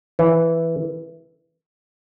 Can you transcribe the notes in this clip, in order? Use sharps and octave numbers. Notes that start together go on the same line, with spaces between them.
E3